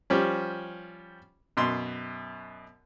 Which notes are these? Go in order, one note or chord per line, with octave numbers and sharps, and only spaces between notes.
F3 G3 C#4
F#2 B2 C6